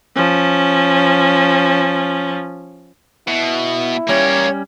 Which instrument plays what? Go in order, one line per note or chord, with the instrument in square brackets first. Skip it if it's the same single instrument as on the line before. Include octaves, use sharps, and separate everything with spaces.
[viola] F3 C#4
[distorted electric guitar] B2 [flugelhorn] E4
[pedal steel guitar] G3 C#4 [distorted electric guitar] A#3 G4 [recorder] C#5